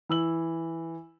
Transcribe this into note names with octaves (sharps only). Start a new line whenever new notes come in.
E3 E6 F#7